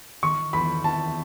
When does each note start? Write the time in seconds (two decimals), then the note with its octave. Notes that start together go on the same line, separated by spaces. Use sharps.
0.23 D#3 C#6
0.53 E2 B5
0.84 E2 A5